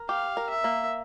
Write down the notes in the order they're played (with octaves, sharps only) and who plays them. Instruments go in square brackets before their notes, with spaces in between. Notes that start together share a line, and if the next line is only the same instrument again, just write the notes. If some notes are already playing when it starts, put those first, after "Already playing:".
Already playing: [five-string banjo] A#4
[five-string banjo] G4 [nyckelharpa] F5
[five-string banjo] A#4
[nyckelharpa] E5
[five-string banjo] A#3